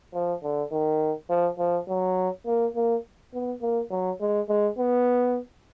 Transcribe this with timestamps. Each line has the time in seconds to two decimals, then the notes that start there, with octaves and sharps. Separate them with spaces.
0.14 F3
0.43 D3
0.72 D#3
1.30 F3
1.59 F3
1.88 F#3
2.46 A#3
2.76 A#3
3.34 B3
3.62 A#3
3.91 F#3
4.21 G#3
4.49 G#3
4.78 B3